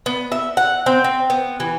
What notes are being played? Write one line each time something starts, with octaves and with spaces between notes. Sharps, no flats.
B3
E5
F#5
C4
C4
B3
E3